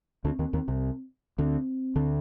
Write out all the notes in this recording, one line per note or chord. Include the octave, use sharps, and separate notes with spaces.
D2 D3 C4
D#2 D#3
D#2 D#3
C2 C3
D2 D3 C4
D2 D3